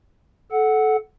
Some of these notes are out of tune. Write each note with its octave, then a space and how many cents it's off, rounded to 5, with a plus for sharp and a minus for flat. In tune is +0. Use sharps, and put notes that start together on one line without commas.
A4 -20 F#5 +0